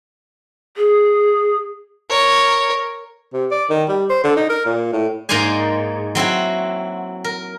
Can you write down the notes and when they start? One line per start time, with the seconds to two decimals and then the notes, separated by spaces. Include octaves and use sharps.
0.77 G#4
2.10 A#4 C#5
3.33 C3
3.51 D5
3.70 D#3
3.89 G3
4.10 C5
4.24 D3
4.37 D#4
4.50 A#4
4.66 A#2
4.93 A2
5.29 G#2 A#3 D#4 C5 D5 G#5
6.15 F#3 C4 E4 F#4
7.24 A#4